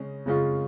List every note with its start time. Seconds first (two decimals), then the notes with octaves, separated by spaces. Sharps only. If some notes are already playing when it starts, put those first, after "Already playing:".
Already playing: C#3 G#3 C#4
0.26 C#3 G#3 C#4 F4